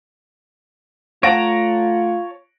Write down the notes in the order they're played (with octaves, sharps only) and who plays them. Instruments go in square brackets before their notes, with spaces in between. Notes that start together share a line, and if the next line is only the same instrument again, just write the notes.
[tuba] A3 [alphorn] F4 [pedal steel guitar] C#5 A5 A#5 [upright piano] F#5 A#6 D7